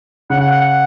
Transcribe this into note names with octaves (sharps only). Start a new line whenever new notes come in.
C#3 F#5
F#5
F#5
F#5